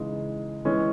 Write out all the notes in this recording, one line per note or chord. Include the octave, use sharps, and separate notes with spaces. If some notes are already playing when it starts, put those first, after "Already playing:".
Already playing: C#3 E3 G#3 D#4
E3 G#3 C#4